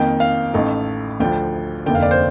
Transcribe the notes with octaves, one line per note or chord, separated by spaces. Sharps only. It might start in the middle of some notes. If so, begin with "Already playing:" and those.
Already playing: F2 D#3 A#3 G5
F5
A1 A2 A3 D#4
D2 D3 F3 G5
F1 D#2 D3 G5
F5
D5
C5